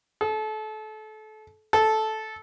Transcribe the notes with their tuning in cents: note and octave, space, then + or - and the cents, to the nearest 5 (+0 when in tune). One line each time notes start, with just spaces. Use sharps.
A4 -30
A4 -10